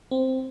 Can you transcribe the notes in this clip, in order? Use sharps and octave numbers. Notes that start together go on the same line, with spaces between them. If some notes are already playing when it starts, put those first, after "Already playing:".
C4